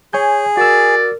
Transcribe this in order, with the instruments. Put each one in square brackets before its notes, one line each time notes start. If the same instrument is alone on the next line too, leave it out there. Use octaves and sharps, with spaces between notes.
[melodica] G#4 [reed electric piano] C#5 G#5 G6
[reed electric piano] F#4 E6 [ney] A#4 [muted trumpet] D5